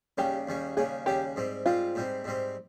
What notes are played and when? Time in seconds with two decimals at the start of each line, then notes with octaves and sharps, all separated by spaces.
0.18 D#2 C#3 G3 C#4 G4
0.47 D#2 C#3 G3 C#4
0.77 D#2 C#3 G3 C#4 G#4
1.06 D#2 C#3 G3 C#4 G4
1.36 G#2 G3 C4
1.66 G#2 G3 C4 F4
1.95 G#2 G3 C4
2.24 G#2 G3 C4